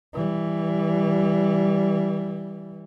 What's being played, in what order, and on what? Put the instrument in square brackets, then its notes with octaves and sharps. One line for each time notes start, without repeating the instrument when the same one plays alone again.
[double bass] E3 G3